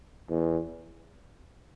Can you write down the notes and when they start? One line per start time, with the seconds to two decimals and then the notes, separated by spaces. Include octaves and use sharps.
0.29 E2